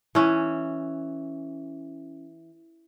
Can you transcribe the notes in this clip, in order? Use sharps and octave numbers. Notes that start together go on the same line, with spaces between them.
E3 C#4